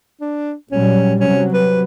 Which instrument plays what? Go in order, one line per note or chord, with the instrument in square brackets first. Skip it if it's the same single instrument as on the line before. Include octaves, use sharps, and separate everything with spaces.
[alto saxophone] D4
[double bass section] A#2 F#3 G3 [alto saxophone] C#4
[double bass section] C3 F#3 [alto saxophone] C#4
[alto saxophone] B4